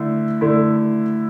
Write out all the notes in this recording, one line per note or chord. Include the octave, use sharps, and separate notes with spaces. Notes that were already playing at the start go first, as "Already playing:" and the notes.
Already playing: D3 A3 E4
D3 A3 E4